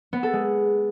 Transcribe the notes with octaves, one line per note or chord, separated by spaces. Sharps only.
B3
A4
G#3